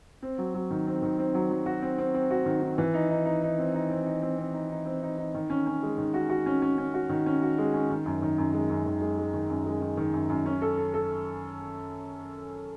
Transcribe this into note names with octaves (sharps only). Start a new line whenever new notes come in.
C4
F#3
F#3
D#3
C4
D#3
C4
F#3
F#3
F#4
C4
C4
C4
F#4
D#3
D#3
E3
D#4
D#4
D#4
D#4
C4
D#4
C4
D#4
C4
C4
D#4
D#4
C4
D#4
D#4
D#3
C#4
C#4
G#3
D#3
F#4
F#4
C#4
C#4
C#4
F#4
D#3
C#4
F#4
G#3
C#4
D#3
F#2
D#3
F#2
G#3
F#2
D#3
G#3
G#3
D#3
F#2
G#3
D#3
D#3
F#2
F#2
C#4
A4
A4
A4